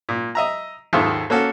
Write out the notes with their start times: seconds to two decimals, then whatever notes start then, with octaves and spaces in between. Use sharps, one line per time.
0.09 A#2
0.35 D#5 E5 A#5
0.93 D#2 G#2 D#3 F4 A4 E5
1.30 A#3 C#4 F#4 A4